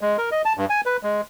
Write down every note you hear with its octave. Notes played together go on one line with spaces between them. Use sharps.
G#3
A#4
D#5
A5
G2
G#5
B4
G#3